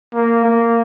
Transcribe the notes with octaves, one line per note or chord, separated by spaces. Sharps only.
A#3
A#3